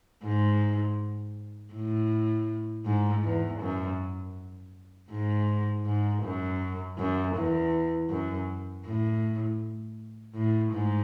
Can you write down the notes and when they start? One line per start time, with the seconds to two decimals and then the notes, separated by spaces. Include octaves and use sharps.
0.24 G#2
1.74 A2
2.85 G#2
3.24 E2
3.61 F#2
5.11 G#2
5.86 G#2
6.23 F#2
6.98 F#2
7.36 E2
8.10 F#2
8.85 A2
10.35 A2
10.73 G#2